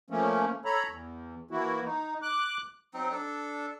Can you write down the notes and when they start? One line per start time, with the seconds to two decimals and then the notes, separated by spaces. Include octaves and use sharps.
0.10 F3 A3 A#3 C#4
0.65 A4 C#5 A#5 B5
0.87 E2
1.51 E3 A#3 E4 F#4
1.84 D#4
2.22 D6 F#6
2.94 F#3 C4 D#4
3.11 D4 A4